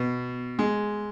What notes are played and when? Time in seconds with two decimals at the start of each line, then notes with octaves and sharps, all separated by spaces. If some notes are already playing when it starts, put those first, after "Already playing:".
Already playing: B2
0.59 G#3